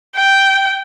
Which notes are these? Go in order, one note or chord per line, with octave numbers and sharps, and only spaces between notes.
G5